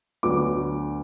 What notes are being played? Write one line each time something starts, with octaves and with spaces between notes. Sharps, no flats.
D2 D3 F#3 B3 D4 D6